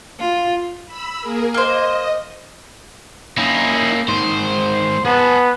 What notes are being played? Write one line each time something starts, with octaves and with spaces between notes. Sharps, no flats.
F4
B5 E6
A#3 G#4 A#4
A#3 C5 D#5
A#3 C#4 D#4 E4
G#2 D#3 C5
B3 G#4 A5